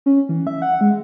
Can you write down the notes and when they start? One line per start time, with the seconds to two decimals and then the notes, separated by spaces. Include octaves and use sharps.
0.06 C#4
0.29 E3
0.47 E5
0.62 F#5
0.81 G#3